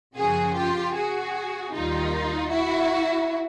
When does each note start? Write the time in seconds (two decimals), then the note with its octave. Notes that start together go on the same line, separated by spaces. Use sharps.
0.17 F#2 C#3 F3 F#4 G#4
0.55 F4 G4
0.95 F#4 G#4
1.73 D#2 D#3 G3 D#4 F4
2.51 E4 F#4